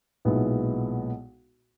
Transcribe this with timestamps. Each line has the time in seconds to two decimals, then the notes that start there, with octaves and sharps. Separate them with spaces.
0.25 B1 A#2 G#3 B3 E4